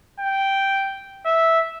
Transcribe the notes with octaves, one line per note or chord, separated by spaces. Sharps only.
G5
E5